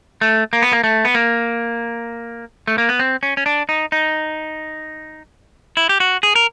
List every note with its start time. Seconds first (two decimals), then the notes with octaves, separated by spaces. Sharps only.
0.21 A3
0.53 A#3
0.62 B3
0.73 A#3
0.84 A3
1.05 B3
1.15 A#3
2.67 A3
2.78 A#3
2.89 B3
2.99 C4
3.23 C#4
3.37 C#4
3.46 D4
3.69 D#4
3.92 D#4
5.77 E4
5.89 G4
6.00 F#4
6.23 G#4
6.35 A#4